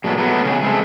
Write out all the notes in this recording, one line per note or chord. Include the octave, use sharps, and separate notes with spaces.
A#2 F#3 G#3 A3 B3
F#3 A3 B3
C#3 G#4 D#5
G#3 A3 C4